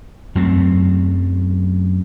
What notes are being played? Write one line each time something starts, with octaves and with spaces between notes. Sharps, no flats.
F#2 F#3 A3 C4